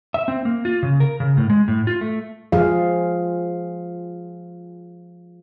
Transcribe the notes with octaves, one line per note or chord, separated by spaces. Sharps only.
E5
C4
A#3
F4
C#3
A#4
C#3
A2
G#3
A2
F4
A3
F3 G#4 F5